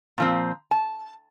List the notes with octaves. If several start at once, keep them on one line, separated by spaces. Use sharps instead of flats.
A#2 F3 C4
A5